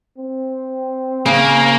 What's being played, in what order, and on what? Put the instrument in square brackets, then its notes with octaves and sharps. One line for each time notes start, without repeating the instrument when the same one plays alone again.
[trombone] C4
[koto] C#3 [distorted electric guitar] A#3